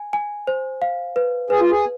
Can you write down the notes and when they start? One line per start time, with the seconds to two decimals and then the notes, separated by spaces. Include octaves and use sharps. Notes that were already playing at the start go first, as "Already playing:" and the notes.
Already playing: G#5
0.13 G#5
0.47 C5
0.82 F5
1.16 B4
1.50 G#4 B4
1.60 F4
1.71 G#4